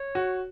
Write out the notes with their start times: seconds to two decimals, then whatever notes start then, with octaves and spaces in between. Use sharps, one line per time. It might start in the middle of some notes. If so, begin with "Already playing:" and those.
Already playing: C#5
0.15 F#4